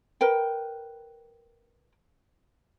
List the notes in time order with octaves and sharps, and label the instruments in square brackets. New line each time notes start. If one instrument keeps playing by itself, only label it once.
[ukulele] A#4 B4 G5